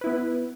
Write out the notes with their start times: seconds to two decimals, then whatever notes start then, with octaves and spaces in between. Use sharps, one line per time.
0.01 B4
0.04 E4
0.07 B3